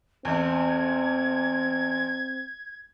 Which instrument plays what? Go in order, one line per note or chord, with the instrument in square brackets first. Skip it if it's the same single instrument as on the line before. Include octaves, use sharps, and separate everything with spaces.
[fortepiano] A1 E2 [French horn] C4 [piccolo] G#6